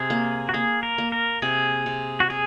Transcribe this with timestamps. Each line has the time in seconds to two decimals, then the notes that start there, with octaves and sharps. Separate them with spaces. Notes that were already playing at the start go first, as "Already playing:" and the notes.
Already playing: C3 G#4
0.10 A#3
0.49 F#4
0.54 A#3 G#4
0.83 A#4
0.98 A#3
1.12 A#4
1.42 C3 G#4
1.86 C3
2.20 F#4
2.30 C3 G#4